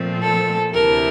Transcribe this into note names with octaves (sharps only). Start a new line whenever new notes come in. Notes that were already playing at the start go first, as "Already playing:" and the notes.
Already playing: A#2 F3 A3 C4
A4
D2 C3 E3 A#4